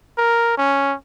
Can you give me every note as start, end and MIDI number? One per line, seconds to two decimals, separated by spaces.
0.18 0.55 70
0.58 0.95 61